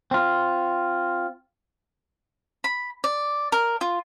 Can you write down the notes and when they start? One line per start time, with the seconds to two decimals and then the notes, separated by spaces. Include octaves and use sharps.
0.11 C4 F4
2.64 B5
3.04 D5
3.52 A#4
3.81 F4